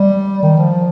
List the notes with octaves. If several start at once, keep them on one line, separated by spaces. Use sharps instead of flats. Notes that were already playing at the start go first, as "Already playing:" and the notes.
Already playing: G3
D#3
F3